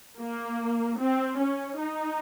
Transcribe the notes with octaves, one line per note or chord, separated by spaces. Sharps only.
A#3
C4
C#4
D#4